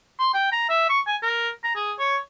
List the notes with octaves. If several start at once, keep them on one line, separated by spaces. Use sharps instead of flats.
C6
G5
A#5
E5
C#6
G#5
A#4
A#5
G#4
C#5